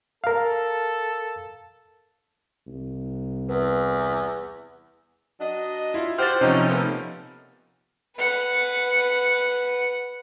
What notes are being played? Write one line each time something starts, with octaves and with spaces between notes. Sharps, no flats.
A4 A#4 F5
C2
E2 B4
F#3 D4 D#5
E4 F4
F#4 G4 C5 F6 A6
C3 F3 C#4 D#4
A#2 A3 B3
B4 F#5